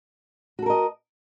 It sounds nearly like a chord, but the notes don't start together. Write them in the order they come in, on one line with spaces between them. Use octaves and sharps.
F#4 A4 A#4 D#5